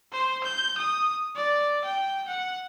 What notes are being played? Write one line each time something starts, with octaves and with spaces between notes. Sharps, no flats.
C5
G6
D#6
D5
G5
F#5